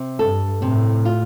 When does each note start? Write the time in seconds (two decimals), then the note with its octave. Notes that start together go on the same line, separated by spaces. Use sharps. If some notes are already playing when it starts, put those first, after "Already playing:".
Already playing: C3
0.18 G2 A4
0.61 A2 C3
1.05 F4